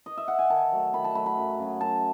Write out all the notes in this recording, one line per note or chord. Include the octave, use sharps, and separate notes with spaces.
D#5
E5
F#5
G#5
D#3 A5
F#3 A3
D#3 B5
A5
F#3 A3 B5
B5
F#2
C#3 F#3 C#4
F#2 A5